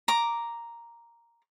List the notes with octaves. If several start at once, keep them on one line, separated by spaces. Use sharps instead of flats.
A#5 D6